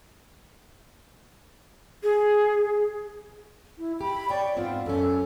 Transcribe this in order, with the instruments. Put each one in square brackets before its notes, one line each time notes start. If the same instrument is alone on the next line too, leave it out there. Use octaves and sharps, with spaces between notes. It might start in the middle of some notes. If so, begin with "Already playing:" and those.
[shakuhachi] G#4
[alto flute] E4
[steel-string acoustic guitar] G4 [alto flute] B5
[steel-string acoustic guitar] C#5 G5 [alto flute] D5
[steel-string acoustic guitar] G#2 B3 C4 [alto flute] F4
[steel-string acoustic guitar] F#2 C#4 [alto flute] A4